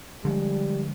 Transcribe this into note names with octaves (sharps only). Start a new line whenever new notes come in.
D3 F3 G3 G#3